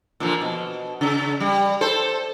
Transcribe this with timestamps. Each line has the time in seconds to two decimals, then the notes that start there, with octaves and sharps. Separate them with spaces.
0.20 A#2 D3 F3
0.42 B2
1.01 C#3
1.40 G3
1.81 A4 C5